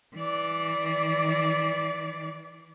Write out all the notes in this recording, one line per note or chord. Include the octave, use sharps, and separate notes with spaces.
E3 D5